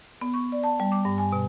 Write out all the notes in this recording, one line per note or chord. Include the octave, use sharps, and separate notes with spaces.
B3
C#6
D5
A5
G3
D6
G2
G#5
B2